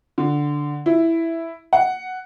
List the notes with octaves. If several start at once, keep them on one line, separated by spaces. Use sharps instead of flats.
D3
E4
F#5